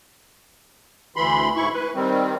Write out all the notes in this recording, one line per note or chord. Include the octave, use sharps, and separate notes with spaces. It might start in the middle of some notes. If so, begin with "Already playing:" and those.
D2 E3 B5 C6
G#2 E4 C#6
B4
D#3 G3 C4